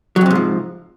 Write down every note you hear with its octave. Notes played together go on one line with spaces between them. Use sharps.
F2 G#2 C3 F3 F#3